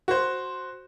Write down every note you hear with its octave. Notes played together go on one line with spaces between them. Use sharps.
F#4 C5